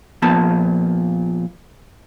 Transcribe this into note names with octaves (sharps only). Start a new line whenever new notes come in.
A#2 F3 B3 A5